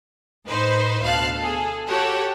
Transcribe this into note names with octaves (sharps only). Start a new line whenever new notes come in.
A2 D#4 B4 C5
D2 B2 F5 A5 F#6
G#4 A4
F#4 G4 A4 C#5 F#5